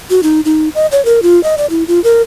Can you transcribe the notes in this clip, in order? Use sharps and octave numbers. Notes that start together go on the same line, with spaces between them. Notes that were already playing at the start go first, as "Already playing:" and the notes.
F#4
D#4
D#4
D#5
C#5
A#4
F4
D#5
D5
E4
F4
A#4